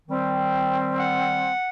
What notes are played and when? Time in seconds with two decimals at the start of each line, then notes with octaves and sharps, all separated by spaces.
0.07 D#3 G3 C4
0.98 F#5